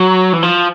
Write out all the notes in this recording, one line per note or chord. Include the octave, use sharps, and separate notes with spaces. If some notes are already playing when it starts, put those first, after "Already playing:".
Already playing: F#3
E3
F3